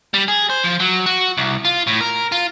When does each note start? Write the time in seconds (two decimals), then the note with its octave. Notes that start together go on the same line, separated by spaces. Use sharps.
0.14 G3
0.28 G#4
0.50 C5
0.64 F3
0.80 F#3
1.06 F#4
1.37 C2
1.65 F4
1.87 A2
2.01 A#4
2.32 F4